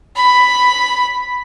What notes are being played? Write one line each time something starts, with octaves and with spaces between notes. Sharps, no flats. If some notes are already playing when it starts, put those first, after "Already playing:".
B5